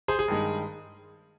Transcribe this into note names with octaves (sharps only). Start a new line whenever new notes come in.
G#4 C5
G#4
G2 D#3 G#3